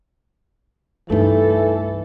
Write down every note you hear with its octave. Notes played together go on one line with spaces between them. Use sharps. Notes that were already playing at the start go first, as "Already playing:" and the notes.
C2 G2 E3 A3 D#4 A4